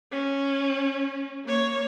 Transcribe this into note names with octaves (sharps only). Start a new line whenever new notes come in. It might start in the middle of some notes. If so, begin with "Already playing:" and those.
C#4
A#3 C#5